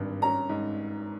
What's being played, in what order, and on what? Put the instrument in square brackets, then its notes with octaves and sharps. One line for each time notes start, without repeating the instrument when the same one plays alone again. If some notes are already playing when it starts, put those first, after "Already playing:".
Already playing: [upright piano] G#1 G2
C#4 A#5
G#2